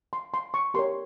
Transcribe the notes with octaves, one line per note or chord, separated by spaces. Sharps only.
C6
C6
C#6
G4 A#4 C#5 C6